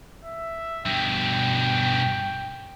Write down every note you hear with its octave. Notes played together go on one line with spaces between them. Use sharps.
E5
G2 B2 G5